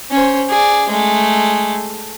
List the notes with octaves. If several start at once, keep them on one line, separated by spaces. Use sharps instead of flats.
C#4 C5
G#4 D5
G#3 A3